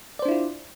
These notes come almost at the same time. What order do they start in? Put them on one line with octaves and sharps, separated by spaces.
D5 C5 D4 E4 F4